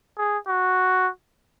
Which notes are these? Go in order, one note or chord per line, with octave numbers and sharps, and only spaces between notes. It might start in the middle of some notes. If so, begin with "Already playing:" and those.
G#4
F#4